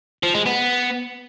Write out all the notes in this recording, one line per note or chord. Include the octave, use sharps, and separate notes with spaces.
F3
G#3
B3